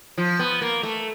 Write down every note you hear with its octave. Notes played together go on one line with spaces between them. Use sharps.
F3
B3
A#3
A3